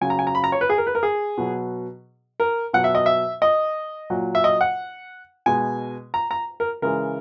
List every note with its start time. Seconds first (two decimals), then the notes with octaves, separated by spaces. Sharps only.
0.01 C#3 F#3 G#5
0.10 A#5
0.19 G#5
0.27 A#5
0.35 B5
0.44 A#5
0.52 C#5
0.61 B4
0.70 G#4
0.78 A#4
0.87 B4
0.95 A#4
1.03 G#4
1.38 B2 F#3
2.40 A#4
2.73 B2 F#3 F#5
2.84 E5
2.95 D#5
3.06 E5
3.42 D#5
4.10 A#2 F#3
4.35 E5
4.44 D#5
4.61 F#5
5.46 B2 G#3 G#5
6.14 A#5
6.31 A#5
6.60 A#4
6.82 C#3 E3 G#3 A#4